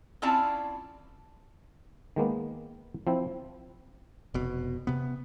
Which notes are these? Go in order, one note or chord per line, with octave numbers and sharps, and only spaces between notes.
C4 C#4 E4 F4 D5 A5
D#3 G#3 A#3 B3
F3 C4 E4
F1 B2
C3 B3